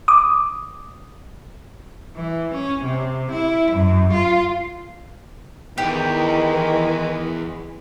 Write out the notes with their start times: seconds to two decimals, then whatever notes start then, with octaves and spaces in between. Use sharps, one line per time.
0.08 D6 D#6
2.16 E3
2.54 C#4
2.84 C3
3.31 E4
3.71 F#2
4.13 F4
5.78 E2 D#3 E3 G#3 G4